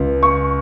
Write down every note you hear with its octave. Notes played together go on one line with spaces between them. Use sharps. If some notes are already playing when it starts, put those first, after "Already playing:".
Already playing: C#2
C#6